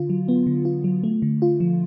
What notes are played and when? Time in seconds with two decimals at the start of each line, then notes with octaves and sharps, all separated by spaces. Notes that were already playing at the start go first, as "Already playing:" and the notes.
Already playing: D3 F4
0.10 F#3
0.28 B3
0.46 D3
0.65 F4
0.84 F#3
1.03 A3
1.22 D3
1.42 F4
1.60 F3